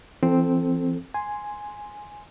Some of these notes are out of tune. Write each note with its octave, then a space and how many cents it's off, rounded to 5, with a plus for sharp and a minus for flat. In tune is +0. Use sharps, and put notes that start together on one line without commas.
E3 +45 C4 +0 A4 +0
G#5 +0 C6 +0